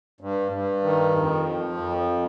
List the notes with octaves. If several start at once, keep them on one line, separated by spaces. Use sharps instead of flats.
G2
G2
D#3
F2
F3
F2